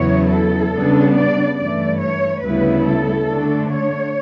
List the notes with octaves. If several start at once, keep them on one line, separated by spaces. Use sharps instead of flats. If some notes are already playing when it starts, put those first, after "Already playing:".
Already playing: E2 C#3 F#3 B3 E4 C#5
A4
C#3 G3 B3 D4
D5
G2 E3 A3 D5
C#5
D2 C#3 G3 B3 E4 B4
A4
D3 A3 D4
C#5